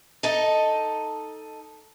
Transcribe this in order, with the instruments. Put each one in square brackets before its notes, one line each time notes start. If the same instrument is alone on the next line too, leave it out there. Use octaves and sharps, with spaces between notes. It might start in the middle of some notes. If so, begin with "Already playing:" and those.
[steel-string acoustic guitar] D#4 A4 D#5